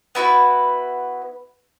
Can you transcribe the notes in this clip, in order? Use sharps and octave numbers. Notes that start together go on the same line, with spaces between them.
B3 E4 F#4 B4